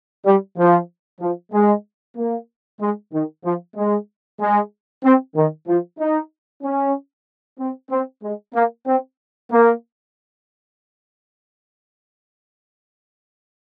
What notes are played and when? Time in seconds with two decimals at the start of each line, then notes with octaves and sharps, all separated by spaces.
0.26 G3
0.58 F3
1.21 F3
1.53 G#3
2.17 A#3
2.81 G#3
3.13 D#3
3.44 F3
3.76 G#3
4.40 G#3
5.04 C4
5.36 D#3
5.68 F3
5.99 D#4
6.63 C#4
7.59 C4
7.91 C4
8.23 G#3
8.54 A#3
8.87 C4
9.51 A#3